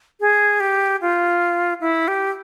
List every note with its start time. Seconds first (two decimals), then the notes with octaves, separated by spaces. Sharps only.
0.20 G#4
0.60 G4
1.01 F4
1.81 E4
2.08 G4